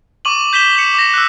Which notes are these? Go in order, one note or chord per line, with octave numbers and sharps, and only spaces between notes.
C#6 D6 D#7 F#7
G6 B6 E7 G7
C#7 E7 G7
D6 A#6
E6 F#6